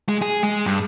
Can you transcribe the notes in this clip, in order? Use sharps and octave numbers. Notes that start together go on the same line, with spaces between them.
G#3
G#4
G#3
G2